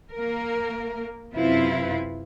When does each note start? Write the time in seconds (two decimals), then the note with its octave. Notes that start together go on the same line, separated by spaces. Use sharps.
0.12 A#3 A#4
1.34 F#2 C3 C4 E4 F4 B4